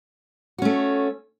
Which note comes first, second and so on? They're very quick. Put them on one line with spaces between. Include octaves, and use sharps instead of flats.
F#4 C#4 A3